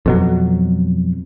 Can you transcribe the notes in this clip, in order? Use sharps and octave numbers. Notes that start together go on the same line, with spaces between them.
F2 B2 F#3